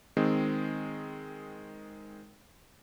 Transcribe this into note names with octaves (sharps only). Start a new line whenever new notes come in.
D#3 G#3 C4